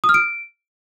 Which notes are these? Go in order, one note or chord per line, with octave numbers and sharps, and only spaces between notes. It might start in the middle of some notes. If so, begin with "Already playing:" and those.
D#6
F6
D7